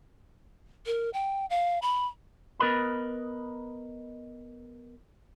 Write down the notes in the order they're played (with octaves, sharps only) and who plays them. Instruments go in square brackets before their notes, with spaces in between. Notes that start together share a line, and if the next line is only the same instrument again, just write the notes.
[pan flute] A#4
G5
F5
B5
[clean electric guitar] B3 A#4 B4 D#5 B5